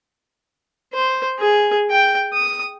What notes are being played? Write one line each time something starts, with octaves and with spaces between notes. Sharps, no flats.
C5
G#4
G5
D#6